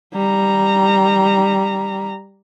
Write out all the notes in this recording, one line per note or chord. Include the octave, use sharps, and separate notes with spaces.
G3 A#5